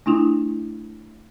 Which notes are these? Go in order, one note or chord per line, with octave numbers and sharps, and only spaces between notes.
A3 D4 E4 F4